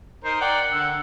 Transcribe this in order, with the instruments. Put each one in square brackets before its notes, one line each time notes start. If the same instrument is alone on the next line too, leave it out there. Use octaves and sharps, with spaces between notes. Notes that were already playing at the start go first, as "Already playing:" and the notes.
[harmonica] D#4 A#4 [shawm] C5
[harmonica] A#4 D5 G5 [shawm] F#5
[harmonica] D3 E6